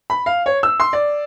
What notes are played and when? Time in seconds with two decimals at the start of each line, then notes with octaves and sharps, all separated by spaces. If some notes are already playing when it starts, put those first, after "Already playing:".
0.10 B5
0.26 F5
0.46 C#5
0.63 E6
0.80 C6
0.93 D5